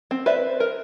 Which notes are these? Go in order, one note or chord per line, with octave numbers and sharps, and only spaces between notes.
C4
B4 C5 D5 E5
A#4